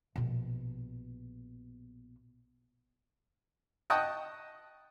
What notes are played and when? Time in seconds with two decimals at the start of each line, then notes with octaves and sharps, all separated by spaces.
0.16 A#1 B2
3.90 D#5 F#5 G5 A5 C#6 D#6